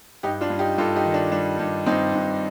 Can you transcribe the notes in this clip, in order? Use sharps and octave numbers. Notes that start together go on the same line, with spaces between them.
G2 D#4 G4
D4 F4
G2
D#4 G4
G2 F4 A4
D#4 G4
D#3
D4
G3 D4
G2
G2 C4 D#4
G2